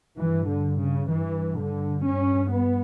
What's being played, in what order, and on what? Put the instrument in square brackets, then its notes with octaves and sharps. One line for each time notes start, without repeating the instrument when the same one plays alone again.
[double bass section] G2 E3
D3
C#3
G2 E3
D3
G2 C#4
B3